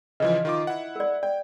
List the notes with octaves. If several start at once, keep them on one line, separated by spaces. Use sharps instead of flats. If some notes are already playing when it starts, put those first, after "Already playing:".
C#3 E3 F3 B4 D#5
D#3 F4 D6
E4 F#5
A#4 D5
D5 G5